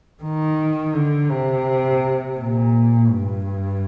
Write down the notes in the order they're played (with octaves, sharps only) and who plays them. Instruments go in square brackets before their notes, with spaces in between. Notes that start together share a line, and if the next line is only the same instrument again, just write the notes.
[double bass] D#3
D3
C3
A#2
G2